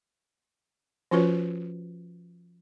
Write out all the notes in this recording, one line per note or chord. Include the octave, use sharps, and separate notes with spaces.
F3 C#4 F4 F#4 B4 C#5